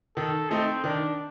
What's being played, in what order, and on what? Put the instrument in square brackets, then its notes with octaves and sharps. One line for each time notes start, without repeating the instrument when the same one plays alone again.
[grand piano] D#3 [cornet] A4
[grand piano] A3 D#4 [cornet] C4
[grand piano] D#3 [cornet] D4